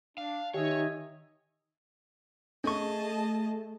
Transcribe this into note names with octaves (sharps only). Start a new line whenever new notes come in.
D4 F5
D#3 G4 C#5 D#5 E5 G#5
A3 C#4 G#4 D#5 A5 C#6